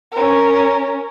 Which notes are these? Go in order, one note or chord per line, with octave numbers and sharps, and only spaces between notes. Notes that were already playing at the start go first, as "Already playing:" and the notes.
C#4 A#4